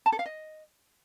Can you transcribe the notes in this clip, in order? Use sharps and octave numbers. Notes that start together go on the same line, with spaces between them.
A5
A4
F5
D#5